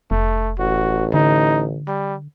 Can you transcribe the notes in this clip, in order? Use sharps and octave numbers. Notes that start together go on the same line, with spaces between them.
F1 A3
A1 F#4
D3 D#4
G3